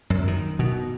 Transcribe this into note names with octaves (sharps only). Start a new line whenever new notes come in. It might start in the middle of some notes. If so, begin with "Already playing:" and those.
F#2
D#3
B2